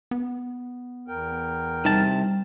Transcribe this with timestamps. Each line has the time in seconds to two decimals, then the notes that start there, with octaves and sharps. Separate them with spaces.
0.11 B3
1.08 E2 A#4 G5
1.85 C2 C3 G3 D#4 A5